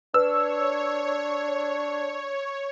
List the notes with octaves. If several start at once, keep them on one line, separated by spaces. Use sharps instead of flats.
D4 B4 C#5 E6